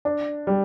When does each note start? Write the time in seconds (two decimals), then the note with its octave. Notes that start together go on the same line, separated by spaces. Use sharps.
0.05 D4
0.47 G3